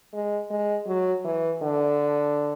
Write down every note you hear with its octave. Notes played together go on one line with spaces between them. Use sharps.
G#3
G#3
F#3
E3
D3